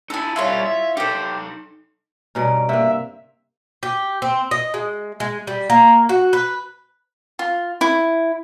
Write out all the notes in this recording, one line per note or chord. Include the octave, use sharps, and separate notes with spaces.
D#4 E4 A4 G#5
G3 E4 F4 C#5 C6
E5
D#4 G4 A4 C5
G2 B2 C#4 D5 A#5
C3 A#3 E5
G4
C4
D#5
G#3
G#3
G3
A#3
F#4
B4
F4
E4